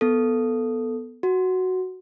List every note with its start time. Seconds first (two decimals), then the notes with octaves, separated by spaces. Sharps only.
0.01 B3 A4
1.23 F#4